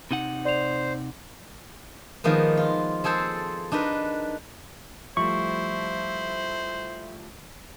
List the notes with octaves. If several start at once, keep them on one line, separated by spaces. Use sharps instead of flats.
C3 D#4 F#5
C5 D5 F7
D#3 F3 G#3 A#3 B3
F4
C4 G#4 A4 C5 A5
D4 D#4 A#4 B4
F3 G3 A3 E4 C5 C#6